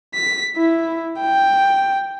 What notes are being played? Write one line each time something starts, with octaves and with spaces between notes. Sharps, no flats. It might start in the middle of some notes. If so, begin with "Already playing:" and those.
B6
E4
G5